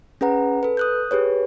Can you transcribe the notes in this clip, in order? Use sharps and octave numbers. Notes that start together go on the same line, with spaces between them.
C#4 G#4 B4 F#5 A#5
A4 B4
D#6 F#6 G6
G4 G#4 B4 C#5